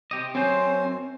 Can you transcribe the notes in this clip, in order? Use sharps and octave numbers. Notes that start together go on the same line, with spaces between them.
C3 G4 D#5
F#2 C4 C#4 C5